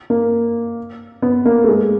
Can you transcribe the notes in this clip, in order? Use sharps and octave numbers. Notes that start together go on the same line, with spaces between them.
A#3
B3
A#3
A3
G#3